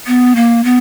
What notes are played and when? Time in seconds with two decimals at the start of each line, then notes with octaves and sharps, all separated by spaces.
0.07 B3
0.36 A#3
0.64 B3